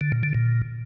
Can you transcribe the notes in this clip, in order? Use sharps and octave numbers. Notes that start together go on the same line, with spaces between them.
D3
A#2
D3
A#2